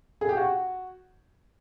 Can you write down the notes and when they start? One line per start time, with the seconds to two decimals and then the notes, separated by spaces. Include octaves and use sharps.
0.21 G#4
0.29 G4
0.37 F#4